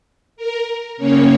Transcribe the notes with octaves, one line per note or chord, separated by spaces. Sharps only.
A#4
C#3 A#3 C#4 C#5